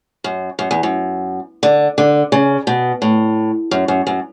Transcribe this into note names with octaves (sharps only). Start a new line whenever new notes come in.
F#2
F#2
E2
F#2
D3
D3
C#3
B2
A2
F#2
F#2
F#2